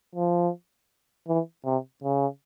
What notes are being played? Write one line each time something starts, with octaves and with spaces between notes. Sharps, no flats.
F3
E3
C3
C#3